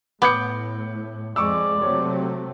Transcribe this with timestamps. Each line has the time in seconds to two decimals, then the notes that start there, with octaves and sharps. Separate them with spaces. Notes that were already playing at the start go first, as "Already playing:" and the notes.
0.22 A2 B3 D6 G6 C#7
1.36 F2 G#3 D5 C#6 D6 E6
1.81 C3 F#3 A3 C#5